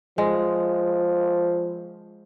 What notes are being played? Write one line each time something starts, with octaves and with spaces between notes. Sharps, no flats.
F3 G#3